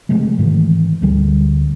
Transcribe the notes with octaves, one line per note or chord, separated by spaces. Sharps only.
C3 F3 G#3 A3
G#2 D#3 E3
D2 G3